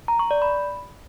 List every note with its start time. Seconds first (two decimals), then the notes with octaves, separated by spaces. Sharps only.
0.08 A#5
0.19 C#6
0.31 D5
0.42 B5